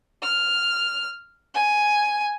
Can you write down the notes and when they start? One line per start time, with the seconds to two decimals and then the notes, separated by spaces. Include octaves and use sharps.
0.22 F6
1.55 G#5